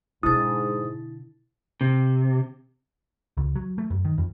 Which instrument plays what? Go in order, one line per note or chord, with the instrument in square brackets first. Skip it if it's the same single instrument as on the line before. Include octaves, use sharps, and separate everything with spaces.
[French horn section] G#2 [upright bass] B2 D3 [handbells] E4 A6 [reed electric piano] D#6
[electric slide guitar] C3
[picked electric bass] C#2
F#3
A3
F#2
D#3
F2